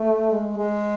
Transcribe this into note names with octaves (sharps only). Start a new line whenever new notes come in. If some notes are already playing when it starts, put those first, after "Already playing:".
Already playing: A3
G#3
G#3